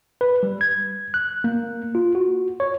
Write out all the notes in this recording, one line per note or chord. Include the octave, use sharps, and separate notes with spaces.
B4
G3
G#6
F#6
A#3
F4
F#4
C#5